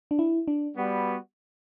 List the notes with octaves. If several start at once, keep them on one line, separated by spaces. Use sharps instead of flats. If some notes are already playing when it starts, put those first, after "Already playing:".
D4
E4
D4
G3 B3 F#4